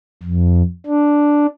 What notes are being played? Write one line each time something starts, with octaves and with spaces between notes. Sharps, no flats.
F2
D4